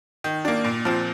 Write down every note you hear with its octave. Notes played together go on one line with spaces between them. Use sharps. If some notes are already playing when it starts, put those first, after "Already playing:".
D#3
A#3 D4
A#2
F3 C4